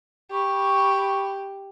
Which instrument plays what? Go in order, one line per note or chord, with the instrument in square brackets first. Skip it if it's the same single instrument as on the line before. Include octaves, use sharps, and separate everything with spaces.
[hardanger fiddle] G4 [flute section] B5 C#6